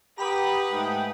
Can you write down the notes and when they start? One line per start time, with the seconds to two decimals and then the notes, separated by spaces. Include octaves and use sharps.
0.18 G4 B4 F#5 A#5 B5 D#6
0.72 G#2 A3 G5